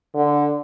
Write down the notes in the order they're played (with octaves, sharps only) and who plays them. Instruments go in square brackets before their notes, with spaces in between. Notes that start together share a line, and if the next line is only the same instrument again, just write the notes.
[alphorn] D3